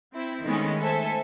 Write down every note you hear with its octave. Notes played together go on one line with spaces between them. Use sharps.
C4 E4
D#3 G#3 A3 B3 C#4
A3 A4 C5 E5 G#5